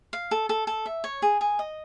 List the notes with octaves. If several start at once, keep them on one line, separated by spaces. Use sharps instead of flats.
F5
A4
A4
A4
E5
C#5
G#4
G#4
D#5